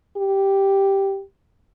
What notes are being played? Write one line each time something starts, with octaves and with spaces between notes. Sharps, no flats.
G4